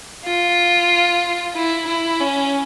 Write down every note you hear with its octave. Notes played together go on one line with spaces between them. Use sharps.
F4
E4
E4
C#4